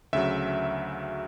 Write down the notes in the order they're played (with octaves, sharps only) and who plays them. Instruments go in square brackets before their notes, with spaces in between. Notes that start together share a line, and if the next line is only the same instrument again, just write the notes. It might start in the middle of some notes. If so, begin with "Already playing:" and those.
[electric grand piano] D2 C#3 F#3 E5